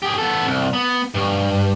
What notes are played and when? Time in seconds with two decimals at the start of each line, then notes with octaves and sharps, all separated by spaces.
0.02 G4 G#4
0.18 B3 A4
0.46 C2
0.73 B3
1.14 G2